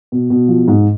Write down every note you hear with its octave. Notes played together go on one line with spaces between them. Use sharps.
B2
B2
F3
G#2